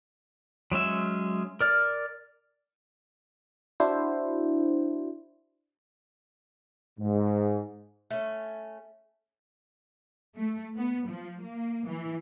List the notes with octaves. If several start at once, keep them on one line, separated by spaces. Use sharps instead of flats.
F#3 G#3 C#4 E5
A#4 D5 F6
D4 E4 F#4 C5
G#2
A3 C#4
A3
B3
F3
A#3
E3